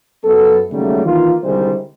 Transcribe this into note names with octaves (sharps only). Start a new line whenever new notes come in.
F#2 B3 A4
D#2 C#3 F#3 G3 A3
D#3 E3 A#3 F4
C2 D3 D#3 G3 G#3 C5